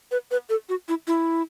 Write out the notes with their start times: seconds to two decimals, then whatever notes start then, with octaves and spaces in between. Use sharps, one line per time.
0.11 B4
0.31 B4
0.50 A4
0.69 F#4
0.88 E4
1.07 E4